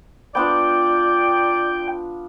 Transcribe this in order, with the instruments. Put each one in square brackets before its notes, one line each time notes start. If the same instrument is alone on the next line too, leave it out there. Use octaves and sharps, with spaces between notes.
[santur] B3 D4 F4 [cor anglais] D5 [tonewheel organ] G5